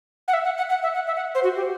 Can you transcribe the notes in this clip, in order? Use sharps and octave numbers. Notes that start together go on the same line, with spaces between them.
F#5
E5
F#5
F#5
F#5
E5
F#5
E5
F#5
C5
F#4
G4